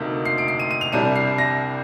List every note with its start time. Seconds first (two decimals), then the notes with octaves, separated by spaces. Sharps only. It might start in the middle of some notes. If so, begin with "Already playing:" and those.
Already playing: D2 C3 A#3 D#4
0.25 C7
0.38 D7
0.48 C7
0.59 D#7
0.71 D#7
0.81 F7
0.92 C2 C3 G3 D4 D#7
1.16 C7
1.38 A#6